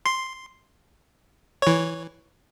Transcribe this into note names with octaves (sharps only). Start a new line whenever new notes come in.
C6
E3 C#5